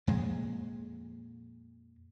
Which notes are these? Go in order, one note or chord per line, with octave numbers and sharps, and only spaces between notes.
F2 A#2 G#3